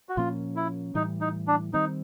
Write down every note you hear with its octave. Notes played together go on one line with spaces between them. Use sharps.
F#4
A#2 F3 A#3 C#4 F4
E4
A2 E3 G3 D#4
D#4
D4
D#3 G3 C4 D#4